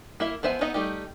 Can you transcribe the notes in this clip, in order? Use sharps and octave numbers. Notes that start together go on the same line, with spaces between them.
A#3 E4 A#4 E5
F3 B3 C5 E5 G#5
B3 D#4 D#5 E5 F#5
G3 A3 D#4 G4